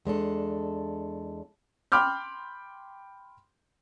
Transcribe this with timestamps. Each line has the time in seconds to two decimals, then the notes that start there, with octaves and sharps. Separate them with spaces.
0.05 E2 G#3 D4 A4
1.92 G5 B5 C6 D6 F6 G6